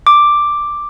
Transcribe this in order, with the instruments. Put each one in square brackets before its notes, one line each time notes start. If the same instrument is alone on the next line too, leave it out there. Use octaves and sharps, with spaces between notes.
[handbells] D6